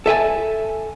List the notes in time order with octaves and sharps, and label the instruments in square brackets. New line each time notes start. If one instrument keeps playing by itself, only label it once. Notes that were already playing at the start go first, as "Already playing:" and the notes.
[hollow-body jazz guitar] A4 E5 G#5 A5